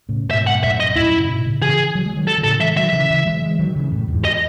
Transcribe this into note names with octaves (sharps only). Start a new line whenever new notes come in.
A2 C#3
G#2 B2 E5
F#5
B2
F#2 A2 E5
D#5
B2
F#2 A2 E4
C#3
G#2 B2
A2 C#3
C#3 E3 G#4
F#3
G#3
D#3 F#3
A4
D#3
A2 C#3 A4
E3 G#3 E5
D#3 F#3 E5
C#3 E3
C#3 E3
E3 G#3
E3 G#3
D#3 F#3
C#3 E3
F#2 A2
E2 G#2
D#5